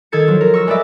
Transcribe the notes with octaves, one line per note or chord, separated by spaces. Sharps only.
D#3 A4 G#6 A6 C#7
F3 F#3
A#4
C#6 E6 A#6
G#3 A3 B4 D5 E5